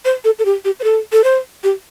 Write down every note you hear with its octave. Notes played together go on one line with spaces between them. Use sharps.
C5
A4
A4
G4
G4
C5
A4
A4
C5
G4